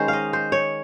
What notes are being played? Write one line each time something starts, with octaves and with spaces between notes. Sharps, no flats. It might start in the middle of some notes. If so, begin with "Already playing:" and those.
Already playing: D#3 G#3 C#4 C5
D#5 F5
C5
C#5